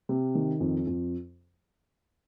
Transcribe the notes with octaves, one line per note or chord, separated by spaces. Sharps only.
C3
D#3
F2
F2